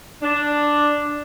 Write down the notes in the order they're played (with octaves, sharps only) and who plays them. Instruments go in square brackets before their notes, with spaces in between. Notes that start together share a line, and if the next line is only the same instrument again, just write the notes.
[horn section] D4